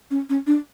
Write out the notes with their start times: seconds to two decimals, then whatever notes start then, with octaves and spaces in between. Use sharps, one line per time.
0.11 C#4
0.29 C#4
0.47 D4